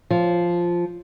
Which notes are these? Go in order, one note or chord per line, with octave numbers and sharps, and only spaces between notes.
F3